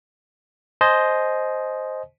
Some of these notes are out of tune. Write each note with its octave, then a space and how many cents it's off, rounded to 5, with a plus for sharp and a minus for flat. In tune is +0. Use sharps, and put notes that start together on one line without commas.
C5 +0 D#5 +0 G#5 +40